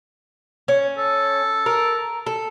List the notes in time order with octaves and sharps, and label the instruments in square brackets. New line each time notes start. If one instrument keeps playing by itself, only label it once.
[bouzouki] C#4
[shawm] A4
[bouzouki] A#4
A4